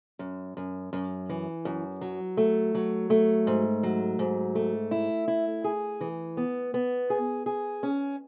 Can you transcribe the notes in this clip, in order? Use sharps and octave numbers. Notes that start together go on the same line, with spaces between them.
F#2
F#2
F#2
E3
F#2
F#3
A3
F#3
A3
G#2
F#3
G#2
A3
E4
E4
G#4
E3
B3
B3
G#4
G#4
C#4